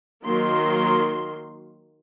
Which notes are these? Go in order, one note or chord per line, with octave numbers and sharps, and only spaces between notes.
D#3 F#3 A#3 C6